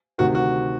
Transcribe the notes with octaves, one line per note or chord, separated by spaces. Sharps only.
D2 C3 D#3 F#4
F#4